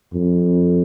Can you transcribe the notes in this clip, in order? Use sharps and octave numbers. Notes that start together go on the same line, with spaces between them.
F2